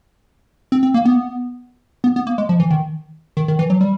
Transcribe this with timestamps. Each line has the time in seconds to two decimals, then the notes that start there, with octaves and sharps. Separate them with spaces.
0.72 C4
0.83 C4
0.94 A#3
1.05 B3
2.04 B3
2.16 B3
2.27 A#3
2.38 G#3
2.49 F3
2.60 E3
2.71 D#3
3.37 D#3
3.48 D#3
3.59 E3
3.70 F#3
3.81 G3